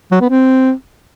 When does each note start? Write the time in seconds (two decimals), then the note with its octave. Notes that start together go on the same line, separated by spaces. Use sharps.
0.11 F#3
0.20 B3
0.30 C4